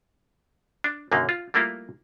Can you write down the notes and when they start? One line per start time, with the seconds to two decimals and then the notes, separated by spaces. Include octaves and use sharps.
0.84 D4
1.11 B1 F#2 D3 D#3 A#3
1.29 F4
1.54 G3 A3 A#3 E4 F4